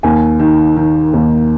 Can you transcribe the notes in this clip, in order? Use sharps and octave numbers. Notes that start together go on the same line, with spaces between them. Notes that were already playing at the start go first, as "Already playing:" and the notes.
D#2 G#5
D#3
D#3
D#2